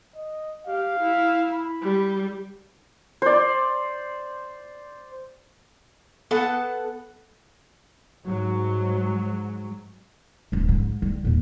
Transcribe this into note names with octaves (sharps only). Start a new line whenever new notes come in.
D#5
G4 F5
E4
B5
G3
C5 D5
B3 A4 F#5 A5
G#2 F#3
D1 C#2
G#2
G3
D#2 A#2